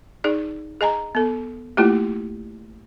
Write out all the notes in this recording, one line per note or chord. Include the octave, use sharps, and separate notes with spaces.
D#4 G#4 D5
G#4 D#5 G#5 A#5
B3 A4
A3 A#3 E4 F4 G4